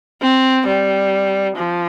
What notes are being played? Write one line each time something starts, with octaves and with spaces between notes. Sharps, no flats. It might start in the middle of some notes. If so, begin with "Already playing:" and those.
C4
G3
F3